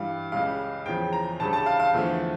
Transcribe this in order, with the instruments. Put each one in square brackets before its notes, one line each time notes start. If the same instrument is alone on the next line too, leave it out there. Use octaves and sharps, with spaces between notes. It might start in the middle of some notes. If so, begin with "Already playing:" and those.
Already playing: [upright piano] G2 E3 G3 F5
C#2 C#3 G3 F5
E2 C#3 F3 G5
A#5
D2 C#3 G3 A5
A5
F5
F5
E2 D3 F3 A3